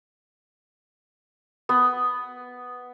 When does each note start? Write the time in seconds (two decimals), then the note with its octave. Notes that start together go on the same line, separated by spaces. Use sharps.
1.69 B3